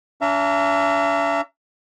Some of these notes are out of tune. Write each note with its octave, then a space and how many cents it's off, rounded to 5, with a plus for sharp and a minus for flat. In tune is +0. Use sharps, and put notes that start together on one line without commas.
D4 -45 E5 +35 A#5 -20